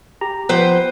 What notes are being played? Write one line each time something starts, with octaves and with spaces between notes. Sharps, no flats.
G4 A#5
F3 B3 B4 C5 G5